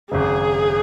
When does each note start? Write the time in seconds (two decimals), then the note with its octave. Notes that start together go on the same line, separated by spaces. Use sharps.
0.11 G#1 F#2 C#3 G#4